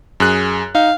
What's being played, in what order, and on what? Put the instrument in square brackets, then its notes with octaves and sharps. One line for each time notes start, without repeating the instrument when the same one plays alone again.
[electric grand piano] F#2 G#4 F#6
[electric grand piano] D#4 [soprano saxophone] F5